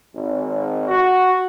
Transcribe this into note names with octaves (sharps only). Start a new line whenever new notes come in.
G#1
F#4